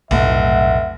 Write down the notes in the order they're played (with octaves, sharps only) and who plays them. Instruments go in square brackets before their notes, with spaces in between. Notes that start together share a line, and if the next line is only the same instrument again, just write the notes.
[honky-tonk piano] F1 [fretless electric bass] B1 A2 [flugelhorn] E5 [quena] F#5